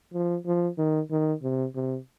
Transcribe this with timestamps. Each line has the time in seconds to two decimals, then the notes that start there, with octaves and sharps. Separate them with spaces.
0.14 F3
0.46 F3
0.78 D#3
1.11 D#3
1.43 C3
1.75 C3